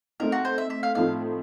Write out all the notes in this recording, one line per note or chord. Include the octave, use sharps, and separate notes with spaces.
A3 C4 D#4 A#4
F#4
C5
E5
E5
F5
A2 F3 A3 C4 D#4 F5